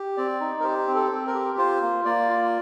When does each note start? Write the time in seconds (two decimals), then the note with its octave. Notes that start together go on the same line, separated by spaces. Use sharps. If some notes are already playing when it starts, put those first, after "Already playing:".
Already playing: G4
0.17 C4 D5
0.41 D#4
0.60 A#4
0.64 G4 C5
0.87 C4
0.95 A4
1.11 C4
1.27 A#4
1.35 G4
1.58 F4 C5
1.82 A#3
2.05 A#3 D5
2.29 F4